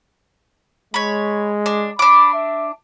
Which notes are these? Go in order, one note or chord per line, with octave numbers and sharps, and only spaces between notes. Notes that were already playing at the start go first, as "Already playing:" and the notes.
G#3 C#5 B5
D4
D4 B5 D6
E5